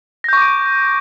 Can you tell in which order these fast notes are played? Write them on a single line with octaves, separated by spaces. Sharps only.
A#6 G6 C#6 D6 D7